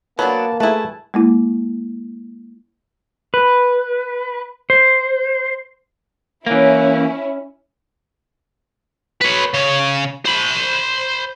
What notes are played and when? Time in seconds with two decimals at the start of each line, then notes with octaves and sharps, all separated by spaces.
0.19 F#3 A#3 B3 D4 B4 A5
0.60 A3 E4 G#4 B4 A5
1.14 G#3 A#3 E4
3.34 B4
4.70 C5
6.46 E3 A#3 C#4 E4
9.21 B4 C#5
9.54 C#3 C#5
10.25 C5 B5